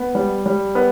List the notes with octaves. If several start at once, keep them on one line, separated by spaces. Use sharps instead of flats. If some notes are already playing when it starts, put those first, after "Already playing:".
Already playing: B3
G3
G3
B3